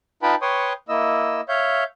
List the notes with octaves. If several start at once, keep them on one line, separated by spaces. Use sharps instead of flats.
D#4 F4 B4 G5 A5 B5
B4 C#5 G5 C6 C#6 D#6
A#3 E4 D#5 E6
C#5 E5 F5 G6